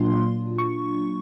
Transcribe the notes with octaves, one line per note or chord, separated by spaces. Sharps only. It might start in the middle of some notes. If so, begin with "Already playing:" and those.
Already playing: A#2 F#3 A#3 D4 F4 C6
C#6